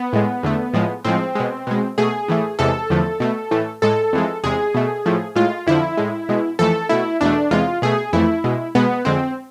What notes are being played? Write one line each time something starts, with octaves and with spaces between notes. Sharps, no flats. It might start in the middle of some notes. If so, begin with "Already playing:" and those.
Already playing: B3
A2 G#3
E2 D3 A3
A2 F3 G#3
A2 F3 G#3 C4
B2 G#3
B2 G#3
B2 A3 G#4
A2 E3 A3
E2 C3 E3 G#3 A4
E2 D3 F3 A3
B2 A3
A2 E3 A3
A2 G#3 A4
F2 E3 G#3
E2 C3 G#3 G#4
B2 A3
A2 F3 A3
A2 G#3 F4
F2 D3 F3 E4
A2 G#3
B2 G#3
F2 E3 A3 A4
B2 A3 E4
E2 B2 A3 D4
E2 C3 G#3 F4
B2 A3 G#4
F2 E3 A3 E4
B2 G#3
B2 G#3 B3
F2 D3 G#3 C4